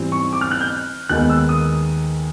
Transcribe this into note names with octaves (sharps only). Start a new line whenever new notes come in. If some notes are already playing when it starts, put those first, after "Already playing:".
Already playing: G#2 E3 G3 C4
C#6
D6
F6
F#6
G6
D#2 D#3 G#3 B3 F#6
E6
D#6